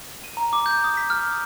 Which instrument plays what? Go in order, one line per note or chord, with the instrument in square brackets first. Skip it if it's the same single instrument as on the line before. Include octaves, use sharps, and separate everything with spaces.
[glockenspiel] D#7
A#5
D6
G6
D#6
B6
F6
D#6